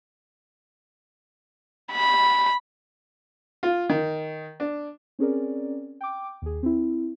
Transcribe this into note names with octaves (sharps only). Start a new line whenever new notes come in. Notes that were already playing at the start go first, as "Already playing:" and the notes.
B5
F4
D#3
D4
C4 C#4 G#4 A#4 D5
G5 D6
D#2 G#4
C4 E4